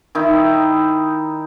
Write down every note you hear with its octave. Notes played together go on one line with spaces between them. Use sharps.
D#3 D#4 E4